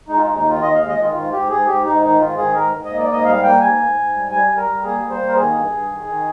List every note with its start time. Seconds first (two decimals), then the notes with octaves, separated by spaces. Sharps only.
0.09 G#3 D#4
0.17 F4
0.23 D#4
0.27 D#2
0.35 D#4
0.44 D#3 F4
0.62 D#2 D#5
0.75 G#3 F5
0.88 D#5
0.97 D#3 F4
1.14 G#2 F4
1.32 G#2 G4
1.49 G#2 G#4
1.67 G#2 G4
1.85 G#2 D#4
2.02 D#3 D#4
2.19 G#2 F4
2.37 D#3 G#4
2.54 G#2 A#4
2.73 G#2
2.85 A#3 D#5
2.99 D5
3.08 G#2 D#5
3.25 G3 F5
3.43 A#3 G5
3.60 G#2 G#5
3.78 G#2
3.96 G#2
4.13 G3
4.30 G3 G#5
4.48 G3
4.57 A#4
4.66 G3
4.83 A#3 G#4
5.01 G3
5.10 C5
5.18 A#3
5.29 A#4
5.36 D#3 G#4
5.53 G2
5.71 G2
5.88 D#3
6.06 D#3